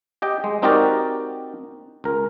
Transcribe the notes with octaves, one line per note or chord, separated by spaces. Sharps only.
G4 D#5 G5
G#3
C4 D#4 F#4 G4 A#4 D5
C#2 A#4